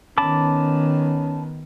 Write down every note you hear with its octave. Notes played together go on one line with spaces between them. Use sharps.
D#3 B3 C#4 A5 B5 D6